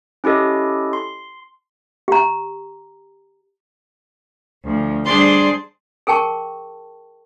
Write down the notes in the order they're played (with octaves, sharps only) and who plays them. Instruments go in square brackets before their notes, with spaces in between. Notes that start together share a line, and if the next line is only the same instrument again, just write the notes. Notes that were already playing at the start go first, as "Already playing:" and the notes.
[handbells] C#4 E4 G4 A4 D#5
C6
[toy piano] G4 A#5
[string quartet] D2 F3
G3 D4 G#4 C5 D5 C6
[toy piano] G#4 A#4 G5 A5 C#6